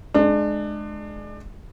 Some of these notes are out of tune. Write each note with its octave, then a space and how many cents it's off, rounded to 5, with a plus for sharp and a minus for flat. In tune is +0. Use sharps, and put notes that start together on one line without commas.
G#3 +25 D4 +30